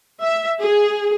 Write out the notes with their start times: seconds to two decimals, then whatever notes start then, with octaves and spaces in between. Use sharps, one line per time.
0.24 E5
0.62 G#4